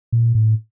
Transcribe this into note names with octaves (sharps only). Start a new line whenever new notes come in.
A#2
A2